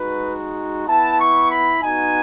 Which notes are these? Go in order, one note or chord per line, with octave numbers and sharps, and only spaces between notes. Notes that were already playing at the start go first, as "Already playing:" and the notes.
Already playing: G#3 D#4 F#4 B4
B3 E4 A5
C#6
B5
B3 D#4 F#4 G#5